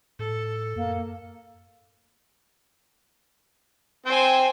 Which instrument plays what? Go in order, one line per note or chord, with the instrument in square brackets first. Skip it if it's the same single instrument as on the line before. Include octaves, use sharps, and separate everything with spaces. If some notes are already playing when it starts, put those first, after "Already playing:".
[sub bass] A2 [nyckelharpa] A4
[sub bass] F#2 [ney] A#3
[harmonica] C4 G5 [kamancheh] C5 G#5